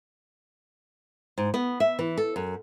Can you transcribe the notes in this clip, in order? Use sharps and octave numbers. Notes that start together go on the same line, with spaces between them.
G#2
B3
E5
E3
A4
F#2